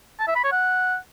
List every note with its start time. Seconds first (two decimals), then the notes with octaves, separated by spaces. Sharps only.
0.19 A5
0.27 E5
0.36 B5
0.44 C#5
0.52 F#5